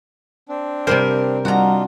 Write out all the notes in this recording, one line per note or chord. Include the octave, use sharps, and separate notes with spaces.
C4 D4
C3 G3 A#4 C5
G3 D4 D#4 F4 F#4 F#5 A#5